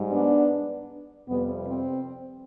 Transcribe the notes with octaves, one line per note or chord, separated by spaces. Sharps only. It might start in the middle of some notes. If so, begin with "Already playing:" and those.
Already playing: G#2 G3
B3 D4
F2 C3 G3 B3
C4